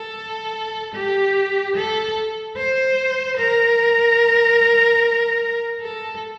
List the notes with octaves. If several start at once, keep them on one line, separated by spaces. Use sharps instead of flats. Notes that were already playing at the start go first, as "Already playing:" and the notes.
Already playing: A4
G4
A4
C5
A#4
A4